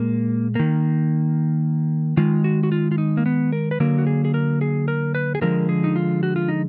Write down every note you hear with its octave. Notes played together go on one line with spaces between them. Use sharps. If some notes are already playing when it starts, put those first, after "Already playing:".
Already playing: A#2 G#3 A#3
D#3 A#3
D#3 G#3 F4
F#4
F#4
F4
F4
D#4
A#3
B3
A#4
B4
D3 F#3 A#3 A#4
F#4
G#4
G#4
A#4
G#4
A#4
B4
G#4
D3 F3 G#3 A#4
G#4
D#4
F4
F#4
F4
D#4